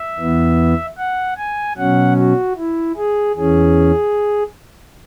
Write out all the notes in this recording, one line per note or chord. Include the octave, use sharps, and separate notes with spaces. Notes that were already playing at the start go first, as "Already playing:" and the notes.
Already playing: E5
E2 E3 B3
F#5
G#5
B2 F#3 C#4 F#5
F#4
E4
G#4
E2 E3 C#4 G#4